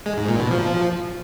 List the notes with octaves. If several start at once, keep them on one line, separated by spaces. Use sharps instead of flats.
G#3
G#2
A#2
B2
F3